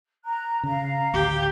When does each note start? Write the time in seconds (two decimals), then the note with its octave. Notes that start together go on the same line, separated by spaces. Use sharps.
0.24 A#5 F#6
0.63 C#3 F5 A#5
1.14 A1 D2 G4